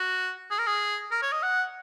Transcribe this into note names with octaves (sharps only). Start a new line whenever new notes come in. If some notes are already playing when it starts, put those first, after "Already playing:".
Already playing: F#4
G#4
A#4
G#4
A#4
C#5
D#5
F#5